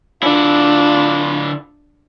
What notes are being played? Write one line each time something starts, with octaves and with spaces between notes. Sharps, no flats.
D3 D4 E4 F4